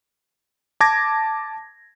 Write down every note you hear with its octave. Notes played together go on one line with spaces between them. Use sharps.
A5 D6 G#6 A#6